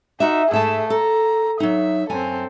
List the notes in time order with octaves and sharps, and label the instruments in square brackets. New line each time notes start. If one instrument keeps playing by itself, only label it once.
[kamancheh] D#4 [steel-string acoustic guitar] F#4 E5
[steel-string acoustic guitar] G#2 E5 A5 [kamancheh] A3 G#4
[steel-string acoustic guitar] A4 [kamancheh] A#5
[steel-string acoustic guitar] F#3 D#4 [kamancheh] E5
[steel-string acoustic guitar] F#2 G#5 A#5 [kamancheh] C4 A4